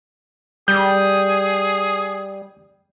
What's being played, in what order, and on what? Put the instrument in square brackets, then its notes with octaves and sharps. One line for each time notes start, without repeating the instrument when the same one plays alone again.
[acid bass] G3 [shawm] G#4 [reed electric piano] G6